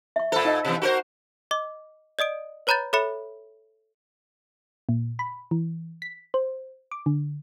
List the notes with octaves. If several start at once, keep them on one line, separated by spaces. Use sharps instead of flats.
E5 C#6
A#2 A4 C5 B5
D#4 D#5
B2 E3
F#4 A#4 C5
D#5 D6
D5 D#5 D#6 D7
B4 C#5 A#5 B5 G6 A6
A4 C#5 E5 B5 C#7
A#2
B5
E3
B6
C5
D6
D3